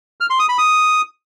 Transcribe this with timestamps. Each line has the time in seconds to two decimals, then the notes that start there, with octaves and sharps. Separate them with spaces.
0.21 F6
0.30 C6
0.39 D#6
0.49 B5
0.58 D#6